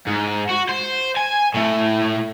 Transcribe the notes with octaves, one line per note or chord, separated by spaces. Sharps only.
G#2
F#4
C5
G#5
A2 A3